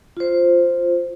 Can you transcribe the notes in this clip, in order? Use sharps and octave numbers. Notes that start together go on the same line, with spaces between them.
F4 C5